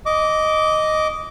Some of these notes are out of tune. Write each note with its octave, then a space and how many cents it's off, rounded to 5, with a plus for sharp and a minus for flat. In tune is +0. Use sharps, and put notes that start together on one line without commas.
D#5 +0 D6 -15